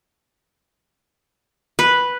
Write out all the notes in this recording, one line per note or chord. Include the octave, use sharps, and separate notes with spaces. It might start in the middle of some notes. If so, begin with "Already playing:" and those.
B4